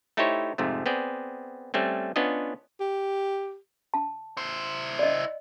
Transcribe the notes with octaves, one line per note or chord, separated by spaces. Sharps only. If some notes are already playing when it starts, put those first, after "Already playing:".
A3 D#4 E4 G4 C5 C#5
F2 G#2 C3 A3
B3 C4 G#4 D5
G3 A3 C4 C#4
B3 C#4 D4 F4 D#5
G4
A5
E4 C5
D5 D#5